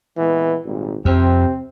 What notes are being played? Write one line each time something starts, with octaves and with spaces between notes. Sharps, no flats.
A#2 E3 G#3 B3
G#1 A#2 G3
F2 C3 C4